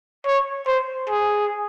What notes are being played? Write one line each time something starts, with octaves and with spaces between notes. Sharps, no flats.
C#5
C5
G#4